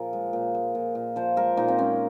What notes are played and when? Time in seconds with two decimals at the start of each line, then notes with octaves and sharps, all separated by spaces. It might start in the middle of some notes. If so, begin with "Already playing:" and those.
Already playing: A#2 F3 G#4 A#4
0.13 G#3
0.33 A#2
0.55 G#3
0.75 A#2
0.95 A#2
1.16 F3 C5
1.37 G#3 A#4
1.57 A#2 D#4
1.68 C4
1.78 G#3 C#4